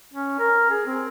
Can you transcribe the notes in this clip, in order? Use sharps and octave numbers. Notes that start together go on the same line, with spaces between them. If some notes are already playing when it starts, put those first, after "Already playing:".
C#4
A#4
G#4
C4